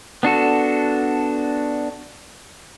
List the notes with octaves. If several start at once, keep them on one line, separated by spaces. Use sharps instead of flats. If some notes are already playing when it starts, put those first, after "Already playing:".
B3 D4 F#4 A4